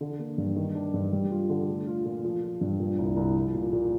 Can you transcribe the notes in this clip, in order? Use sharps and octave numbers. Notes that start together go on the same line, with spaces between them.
D3
A#3
G2
D#3
D4
G2
G3
F4
D3
A3
F4
A#2
F3
F4
G2
A#2
C2
C2
F3
A#2
A#2